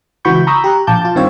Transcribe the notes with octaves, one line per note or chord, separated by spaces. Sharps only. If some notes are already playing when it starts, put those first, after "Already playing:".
C#2 E3 F#4 B5 C#6 G6
A#5 B5 C#6 D#6 E6 G6
G4 A#5 F#6
A#1 F5 A5 D6 G6
F4 A5
G2 D#3 C4 F4 C#5 E6